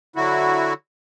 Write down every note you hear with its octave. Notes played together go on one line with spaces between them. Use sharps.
D3 F#3 E4 F#4